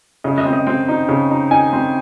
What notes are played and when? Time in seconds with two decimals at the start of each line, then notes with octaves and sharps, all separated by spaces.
0.24 C#3 D#5
0.38 D#5
0.45 C4
0.53 D#5
0.67 C4 G5
0.88 D#4
1.09 C#3
1.31 D#4
1.51 D#4 G#5
1.73 C4